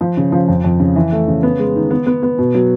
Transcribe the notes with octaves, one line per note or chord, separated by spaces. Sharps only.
F3
C#3
F3
F2
F2
C#3
E3
A3
C#3
B3
G#3
D#3
B3
B3
B3
B2
F#3